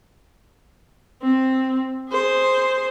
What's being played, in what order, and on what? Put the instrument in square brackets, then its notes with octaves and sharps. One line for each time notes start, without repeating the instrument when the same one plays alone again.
[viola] C4
G#4 C5